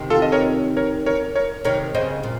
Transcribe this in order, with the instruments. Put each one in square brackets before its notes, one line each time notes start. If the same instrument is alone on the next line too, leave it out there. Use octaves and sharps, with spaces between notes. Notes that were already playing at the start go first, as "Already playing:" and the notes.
Already playing: [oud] C3 D#3
[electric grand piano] F4 A4
D#5
A#4 C#5
A#4 C#5
A#4 C#5
A#4 C#5
[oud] C3 D#3 [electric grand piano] A#4 C#5
[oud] C#3 [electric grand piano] C5 D#5
[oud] A#2